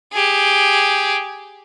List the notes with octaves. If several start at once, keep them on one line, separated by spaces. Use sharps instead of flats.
G4 G#4